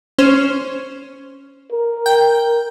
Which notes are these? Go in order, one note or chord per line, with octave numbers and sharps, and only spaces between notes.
C#4 C5
A#4
G5